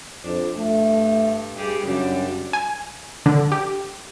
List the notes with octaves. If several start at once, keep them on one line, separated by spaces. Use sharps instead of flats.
F2 D4
G2 A3
G3 G4 G#4
F#2 C#3 G3 D4
G#5
D3
G4